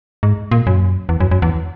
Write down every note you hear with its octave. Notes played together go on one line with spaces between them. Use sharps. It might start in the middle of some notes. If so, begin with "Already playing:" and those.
G#2
A#2
F#2
E2
F#2
F#2
E2